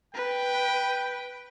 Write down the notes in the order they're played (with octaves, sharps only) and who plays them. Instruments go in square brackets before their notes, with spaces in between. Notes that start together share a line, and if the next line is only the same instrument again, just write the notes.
[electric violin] B4 [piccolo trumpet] G5